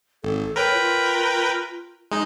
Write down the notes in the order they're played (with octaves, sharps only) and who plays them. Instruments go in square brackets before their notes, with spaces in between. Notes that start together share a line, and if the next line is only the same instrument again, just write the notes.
[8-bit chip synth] G#1 [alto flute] A4
[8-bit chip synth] A#4 B4 G5 [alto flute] C#5
[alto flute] F4
[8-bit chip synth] G#3 D#4